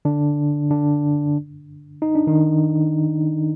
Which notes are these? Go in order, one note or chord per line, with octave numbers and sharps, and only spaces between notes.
D3 D4
D3 D4
D#4
D4
D#3 D#4